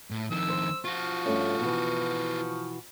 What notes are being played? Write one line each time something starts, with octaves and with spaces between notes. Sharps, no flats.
A2
F2 D#3 E6
C5
F3 F4 F#4 C#6
G2 A3 C#4
B2 E3